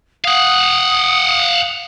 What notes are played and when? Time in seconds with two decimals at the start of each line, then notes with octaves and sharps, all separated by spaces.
0.25 F5 F#5 D#6